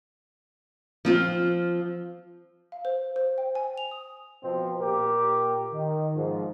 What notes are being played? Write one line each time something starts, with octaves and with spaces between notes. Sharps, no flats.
F3 C4 F4
F5
C5
C5
G5
G#5
F7
D#6
B2 F3 C4
A#2 G4 A#4
D#3
G#2 F3